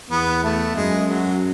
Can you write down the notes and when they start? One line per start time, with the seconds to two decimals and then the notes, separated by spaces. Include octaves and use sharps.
0.10 E2 B3
0.43 A3
0.75 F#2 G#3
1.08 F#3